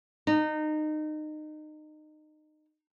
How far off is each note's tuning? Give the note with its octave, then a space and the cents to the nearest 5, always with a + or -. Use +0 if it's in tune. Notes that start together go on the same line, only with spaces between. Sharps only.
D#4 -25